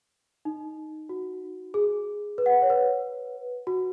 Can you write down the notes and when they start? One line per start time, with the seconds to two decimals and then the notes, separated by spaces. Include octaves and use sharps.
0.45 D#4
1.09 F#4
1.74 G#4
2.38 B4
2.46 F#5
2.62 C#5
2.70 B4
3.67 F#4